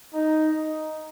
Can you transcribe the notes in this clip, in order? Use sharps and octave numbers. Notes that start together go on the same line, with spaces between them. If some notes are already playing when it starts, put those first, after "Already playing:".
D#4